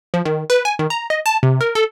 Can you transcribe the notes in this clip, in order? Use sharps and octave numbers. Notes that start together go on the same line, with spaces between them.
F3
D#3
B4
G#5
D#3
A#5
D#5
A5
C3
A#4
A4